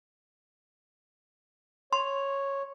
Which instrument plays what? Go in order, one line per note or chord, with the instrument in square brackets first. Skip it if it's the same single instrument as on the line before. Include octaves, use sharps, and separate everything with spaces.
[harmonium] C#5 [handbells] C6